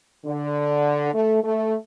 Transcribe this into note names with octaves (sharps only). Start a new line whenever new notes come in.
D3
A3
A3